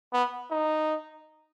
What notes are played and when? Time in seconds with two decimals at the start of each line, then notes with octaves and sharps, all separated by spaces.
0.13 B3
0.51 D#4